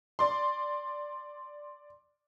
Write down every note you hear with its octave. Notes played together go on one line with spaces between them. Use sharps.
D5 C6